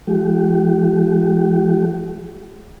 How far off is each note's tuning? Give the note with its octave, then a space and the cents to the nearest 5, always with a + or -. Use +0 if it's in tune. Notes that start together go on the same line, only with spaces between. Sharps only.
F3 -45 G#3 +20 G4 -40